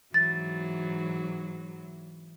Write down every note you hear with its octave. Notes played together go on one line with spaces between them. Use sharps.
G#2 E3 F#3 A6